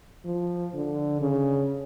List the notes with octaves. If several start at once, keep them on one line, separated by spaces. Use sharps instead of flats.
F3
D3
C#3